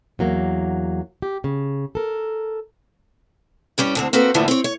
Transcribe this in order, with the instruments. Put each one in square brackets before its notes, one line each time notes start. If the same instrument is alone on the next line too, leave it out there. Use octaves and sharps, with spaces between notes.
[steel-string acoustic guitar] E2 F#3 A#3
G4
C#3
A4 A#4
G2 G3 C#4 G4
D2 D3 C4
A#3 C4 F#4 A4 B4
E2 A2 D3 E3 F3 A#3
C4 C#5
C#5